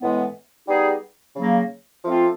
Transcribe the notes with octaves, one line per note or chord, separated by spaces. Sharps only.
A2 E3 G#3 B3
G3 B3 D#4 G#4
C#3 F#3 A#3
F3 A3 C4 F4